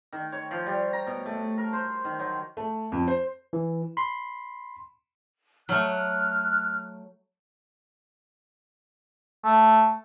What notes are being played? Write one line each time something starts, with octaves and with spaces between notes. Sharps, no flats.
D#3
C#5
F3
G3
A#5
B2
A3
A#4
C5
D#3
F#3
A3
F2
C5
E3
B5 C6
F#3 A3 F6 F#6
A3